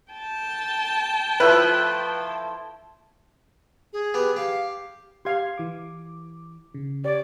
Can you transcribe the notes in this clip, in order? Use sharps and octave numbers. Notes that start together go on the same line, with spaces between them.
G5 A5
F3 A3 E4 B4
G#4
B3 G4
G4 F5
G4 F5 C6 G#6
E3 D6
C#3
G4 C#5 D5